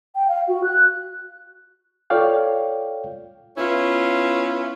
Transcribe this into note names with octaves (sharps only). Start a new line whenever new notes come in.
G5
F5
F#4
F#6
F4 A4 C#5 D5 F5 G5
B3 C#4 E4 F4